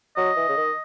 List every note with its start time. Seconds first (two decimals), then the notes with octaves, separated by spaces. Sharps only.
0.16 F#3 D#5
0.37 E3
0.49 C#3
0.57 D#3